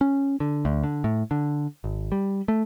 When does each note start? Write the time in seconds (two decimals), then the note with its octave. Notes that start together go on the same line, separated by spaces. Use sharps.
0.01 C#4
0.40 D3
0.65 D2
0.84 D3
1.04 A2
1.31 D3
1.84 G#1
2.12 G3
2.48 A3